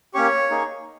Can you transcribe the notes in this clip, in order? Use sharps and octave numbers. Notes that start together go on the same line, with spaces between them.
A#3 C#4 G4 C#5 C#6
A#3 D#4 G#4